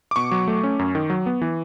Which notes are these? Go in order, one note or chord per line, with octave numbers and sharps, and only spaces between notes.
D6
B2 C#6
F#3
A3
C#4
F#2
D#3
F#3
B3
E3